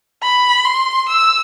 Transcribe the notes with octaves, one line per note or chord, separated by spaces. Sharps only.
B5
C6
E6